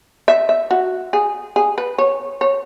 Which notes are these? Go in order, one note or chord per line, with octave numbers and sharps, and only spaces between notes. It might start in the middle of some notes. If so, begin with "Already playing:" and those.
E5
E5
F#4
G#4
G#4
B4
C#5
C#5